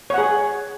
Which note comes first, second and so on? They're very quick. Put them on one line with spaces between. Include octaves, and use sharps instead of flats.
C#5 F#5 G#4